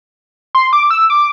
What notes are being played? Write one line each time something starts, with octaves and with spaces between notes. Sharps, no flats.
C6
D6
E6
D6